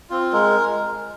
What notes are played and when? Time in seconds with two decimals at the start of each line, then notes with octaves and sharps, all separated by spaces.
0.10 C4 F4
0.33 G#3 A#4